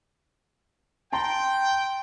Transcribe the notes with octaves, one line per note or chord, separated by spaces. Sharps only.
G5 A5 A#5 C6